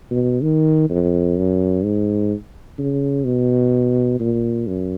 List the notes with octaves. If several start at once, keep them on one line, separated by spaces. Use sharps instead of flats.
B2
D#3
F2
F#2
G#2
C#3
B2
A#2
F#2